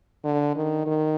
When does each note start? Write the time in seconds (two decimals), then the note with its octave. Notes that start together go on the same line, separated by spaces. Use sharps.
0.24 D3
0.56 D#3
0.86 D#3